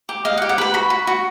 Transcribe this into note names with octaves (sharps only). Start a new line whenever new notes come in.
G4
D#5 F5
F#5
G4
F#5
B4 B5
F#4 B5
F#4
F#4